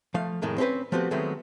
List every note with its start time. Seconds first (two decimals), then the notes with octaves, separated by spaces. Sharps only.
0.14 F3 A3 F5
0.42 F2 A2 D#3 G#3
0.58 C4 C#4 G4 B4 C5
0.92 F3 A3 B3 C4 F#4 G4
1.11 D#3 F#3 G#3 A3 B3 C4